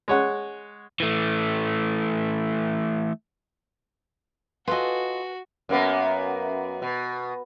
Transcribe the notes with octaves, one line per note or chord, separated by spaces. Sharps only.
G#3 C#5 F#5
E3 A3
F4 F#4 A4 B4 D#5 G#5
F#2 A#3 B3
B2